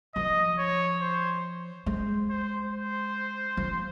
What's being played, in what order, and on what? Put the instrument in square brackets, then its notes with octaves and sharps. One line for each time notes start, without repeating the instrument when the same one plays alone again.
[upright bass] F3 [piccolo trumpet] D#5
[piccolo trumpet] C#5
C5
[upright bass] G#3 [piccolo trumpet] C5
[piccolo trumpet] C5
C5
[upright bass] F3